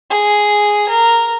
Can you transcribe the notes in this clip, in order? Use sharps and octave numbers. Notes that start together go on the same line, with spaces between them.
G#4
A#4